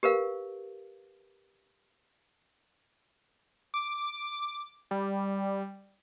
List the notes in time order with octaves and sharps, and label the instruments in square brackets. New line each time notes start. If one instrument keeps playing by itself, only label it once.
[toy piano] G4 A#4 B4 F5
[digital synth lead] D6
G3